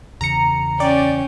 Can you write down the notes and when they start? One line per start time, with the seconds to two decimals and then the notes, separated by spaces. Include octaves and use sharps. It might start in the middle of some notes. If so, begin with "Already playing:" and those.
0.21 E2 C#3 A#5 C#7
0.80 C#4 D5 G5